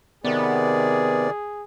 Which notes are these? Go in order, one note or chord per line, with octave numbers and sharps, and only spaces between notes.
C3 D#3 B3 G#4 D5